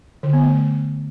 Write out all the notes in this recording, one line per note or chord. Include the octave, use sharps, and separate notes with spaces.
D3
B3
A3